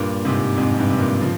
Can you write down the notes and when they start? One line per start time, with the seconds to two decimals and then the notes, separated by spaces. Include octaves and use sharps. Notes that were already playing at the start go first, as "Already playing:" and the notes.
Already playing: G2 A#2
0.25 G#2 C3
0.57 F2 G#2
0.78 G2
0.90 C3
0.99 G2 A#2
1.20 C#3 F3